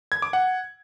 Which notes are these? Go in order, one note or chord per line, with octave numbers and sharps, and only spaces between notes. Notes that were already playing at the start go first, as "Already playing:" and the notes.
G#6
D6
F#5